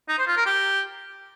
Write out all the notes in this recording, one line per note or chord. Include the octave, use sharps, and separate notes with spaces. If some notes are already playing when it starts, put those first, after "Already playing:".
D#4
C5
F4
A#4
G4